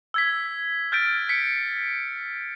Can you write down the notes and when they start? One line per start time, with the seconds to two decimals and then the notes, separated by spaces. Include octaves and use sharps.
0.14 E6 G#6 B6
0.92 F6 G6 A6 B6 D7
1.29 B6 C#7